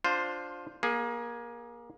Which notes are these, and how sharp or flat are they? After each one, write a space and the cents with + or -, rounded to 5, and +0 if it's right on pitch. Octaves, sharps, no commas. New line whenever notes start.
D4 +0 F4 +20 C5 +0
A#3 +25 G#4 +0